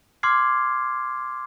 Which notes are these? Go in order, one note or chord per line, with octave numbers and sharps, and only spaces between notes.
C6 D6 F6 G#6 C7